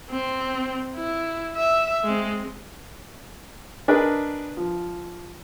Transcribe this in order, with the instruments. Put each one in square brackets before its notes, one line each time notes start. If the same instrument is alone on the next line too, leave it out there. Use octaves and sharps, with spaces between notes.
[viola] C4
E4
E5
G#3 C4
[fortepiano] D4 G#4 A#4 B4 D#5
F3